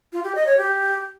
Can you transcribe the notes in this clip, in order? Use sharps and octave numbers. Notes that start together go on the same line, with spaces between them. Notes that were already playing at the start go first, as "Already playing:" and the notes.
F4
G4
D#5
C#5
G4